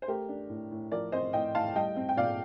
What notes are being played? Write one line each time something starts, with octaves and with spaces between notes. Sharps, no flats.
C5
A3 G4 A#4
D4
A2
A2
F3 A#4 D5
C4 C5 D#5
A2 D#5 G5
A2 F5 A5
G3 D#5 G5
C4
G5
A#2 D5 F5